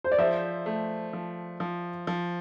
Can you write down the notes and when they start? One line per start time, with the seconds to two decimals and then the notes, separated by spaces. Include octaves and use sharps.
0.04 C5
0.12 D5
0.18 F3 C5 E5
0.66 A3
1.13 F3
1.60 F3
2.07 F3